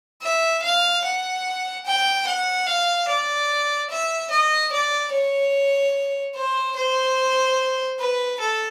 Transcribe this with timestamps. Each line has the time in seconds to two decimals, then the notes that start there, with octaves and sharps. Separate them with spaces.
0.22 E5
0.62 F5
1.04 F#5
1.85 G5
2.27 F#5
2.67 F5
3.08 D5
3.90 E5
4.30 D#5
4.72 D5
5.12 C#5
6.35 C5
6.76 C5
7.99 B4
8.40 A4